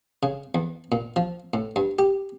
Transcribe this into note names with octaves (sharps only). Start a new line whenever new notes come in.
C#3
E2
A#2
F3
A2
G2
G4